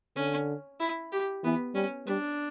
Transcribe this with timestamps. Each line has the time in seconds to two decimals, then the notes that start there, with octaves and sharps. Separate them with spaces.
0.16 D3 C#4
0.80 E4
1.12 G4
1.44 E3 B3
1.74 G3 C#4
2.07 G3 D4